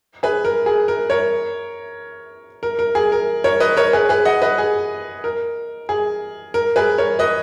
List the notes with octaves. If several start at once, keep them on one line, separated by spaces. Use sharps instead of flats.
G#4 B4
A#4
G#4
A#4
A#4 C#5
A#4
A#4
G#4
A#4
A#4 C#5
B4 D#5
A#4 C#5
G#4 B4
G#4 B4
D#5 F#5
B4 D#5
G#4
A#4
G#4
A#4
G#4 B4
A#4 C#5
B4 D#5